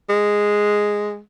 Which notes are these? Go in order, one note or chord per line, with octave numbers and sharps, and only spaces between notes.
G#3